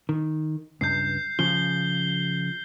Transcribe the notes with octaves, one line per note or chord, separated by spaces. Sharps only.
D#3
C#2 G2 G6 C7
C#3 F3 G7